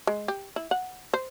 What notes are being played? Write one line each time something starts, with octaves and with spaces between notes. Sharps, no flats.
G#3
G4
E4
F#5
C5